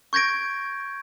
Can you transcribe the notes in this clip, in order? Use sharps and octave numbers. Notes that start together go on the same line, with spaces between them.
C#6 G6 G#6 A#6 D7